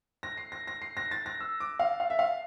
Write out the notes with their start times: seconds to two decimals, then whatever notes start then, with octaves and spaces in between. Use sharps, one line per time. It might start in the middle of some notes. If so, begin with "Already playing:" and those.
0.23 A#6
0.37 C7
0.52 A#6
0.67 A#6
0.82 C7
0.97 A#6
1.11 A6
1.26 A#6
1.41 E6
1.60 D6
1.79 F5
2.00 F5
2.10 E5
2.19 F5